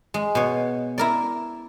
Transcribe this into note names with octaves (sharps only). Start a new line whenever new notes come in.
G#3
B2 C#5
E4 A#4 D5